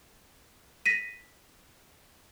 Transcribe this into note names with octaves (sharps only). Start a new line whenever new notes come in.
A#6 B6 D#7